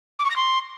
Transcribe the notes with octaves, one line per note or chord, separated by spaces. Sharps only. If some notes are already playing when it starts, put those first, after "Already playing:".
D6
C#6
A#6
C6